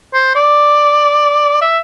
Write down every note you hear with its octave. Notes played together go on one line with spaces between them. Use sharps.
C5
D5
E5